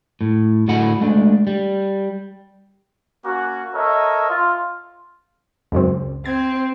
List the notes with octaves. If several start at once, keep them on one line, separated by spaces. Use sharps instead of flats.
A2
A2 D3 F#4 G#4 F#5 B5
G#3 A3 D4
G3
A#3 C#4 F#4
A4 A#4 C#5 D#5 E5
F4
C#2 F#2 C4
C4 G#6